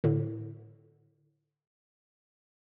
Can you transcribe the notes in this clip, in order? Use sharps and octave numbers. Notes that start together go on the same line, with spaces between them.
A2 D3